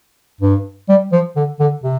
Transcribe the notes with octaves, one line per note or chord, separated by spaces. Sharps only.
G2
G3
F3
D3
D3
C3